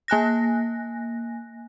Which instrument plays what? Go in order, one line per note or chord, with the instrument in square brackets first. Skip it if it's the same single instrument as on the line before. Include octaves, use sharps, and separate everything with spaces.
[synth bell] A#3 G#5 F#6 A#6